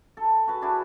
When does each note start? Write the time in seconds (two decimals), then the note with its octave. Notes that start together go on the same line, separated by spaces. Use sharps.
0.17 A4
0.47 F#4 G#4 B4
0.62 D4 E4 F#4